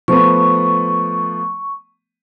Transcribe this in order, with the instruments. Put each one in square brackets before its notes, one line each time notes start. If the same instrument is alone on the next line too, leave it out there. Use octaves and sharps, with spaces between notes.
[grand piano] F3 A3 B3 [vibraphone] C#6